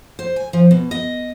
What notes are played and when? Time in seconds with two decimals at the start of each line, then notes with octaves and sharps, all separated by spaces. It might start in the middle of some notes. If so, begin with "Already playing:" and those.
0.19 C5
0.36 G#5
0.53 F3
0.71 B2
0.91 D#5